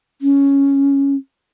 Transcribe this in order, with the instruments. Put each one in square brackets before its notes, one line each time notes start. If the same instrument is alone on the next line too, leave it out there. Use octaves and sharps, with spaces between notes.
[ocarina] C#4